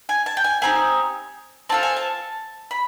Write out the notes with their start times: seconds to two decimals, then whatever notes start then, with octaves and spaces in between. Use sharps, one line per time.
0.09 G#5
0.26 A5
0.37 G5
0.44 G#5
0.62 A3 C4 D#4 G4 G#5
1.69 C4 F4 A4 A5
1.83 G#5
1.96 A5
2.71 B5